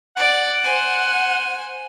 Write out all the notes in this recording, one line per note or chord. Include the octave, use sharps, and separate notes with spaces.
D5 F#5
C5 G#5